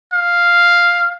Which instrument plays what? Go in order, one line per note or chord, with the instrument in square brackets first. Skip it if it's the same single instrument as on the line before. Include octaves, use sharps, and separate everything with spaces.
[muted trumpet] F5